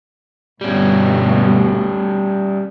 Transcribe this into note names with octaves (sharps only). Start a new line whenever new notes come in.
D2 G2 B2 G3 C#4